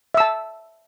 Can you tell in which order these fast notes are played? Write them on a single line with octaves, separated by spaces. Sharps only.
E5 E6 A5